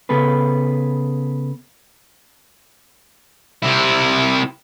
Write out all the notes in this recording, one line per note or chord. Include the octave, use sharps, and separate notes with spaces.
C#3 B3 G#4 A4 B4
C3 E4